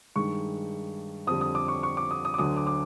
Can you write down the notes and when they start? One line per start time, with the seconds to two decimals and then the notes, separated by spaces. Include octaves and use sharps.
0.16 G2 D#3 G#3 C#6
1.27 F2 D3 G3 D#6
1.41 D#6
1.55 D6
1.68 C#6
1.83 C#6
1.97 D6
2.11 D#6
2.25 D#6
2.34 D6
2.38 D2 D3 F#3 D#6
2.57 D6
2.67 D6